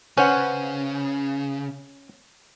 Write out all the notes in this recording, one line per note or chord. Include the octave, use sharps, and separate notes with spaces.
C#3 C#4 B4 C5 F#5